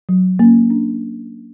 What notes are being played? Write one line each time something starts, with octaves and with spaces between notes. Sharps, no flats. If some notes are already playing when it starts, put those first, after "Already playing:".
F#3
A#3 C#4
D4